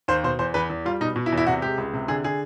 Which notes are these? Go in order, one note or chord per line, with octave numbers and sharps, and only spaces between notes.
D#2 C5
B2 C5
E2 C5
E2 B4
E2
G3 F4
B2 D#4
B2
E4
E2
E4
C3 F#4
G#3 G4
C#2
C3
D3 G#4
D3 G#4